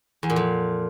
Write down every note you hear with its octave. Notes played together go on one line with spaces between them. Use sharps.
E2
A#2
F2